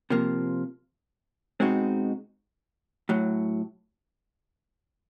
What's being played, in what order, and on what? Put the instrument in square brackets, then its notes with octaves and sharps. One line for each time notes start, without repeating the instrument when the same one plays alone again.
[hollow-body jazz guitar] C3 F3 A#3
B2 G#3 C4 D#4 F#4
A2 F#3